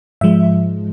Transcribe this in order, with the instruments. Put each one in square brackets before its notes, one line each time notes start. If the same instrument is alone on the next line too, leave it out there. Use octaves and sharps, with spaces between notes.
[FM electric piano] G#2 F3 G#3 E5